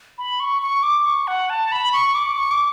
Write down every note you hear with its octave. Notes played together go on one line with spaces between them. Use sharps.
B5
C#6
C#6
D6
C#6
F#5
A5
B5
C#6
D6
C#6
D6